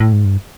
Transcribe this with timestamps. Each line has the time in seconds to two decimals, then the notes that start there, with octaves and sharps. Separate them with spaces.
0.00 A2
0.13 G#2
0.25 G2